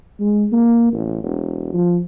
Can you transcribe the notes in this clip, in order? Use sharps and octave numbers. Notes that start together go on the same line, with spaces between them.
G#3
A#3
A1
E1
F3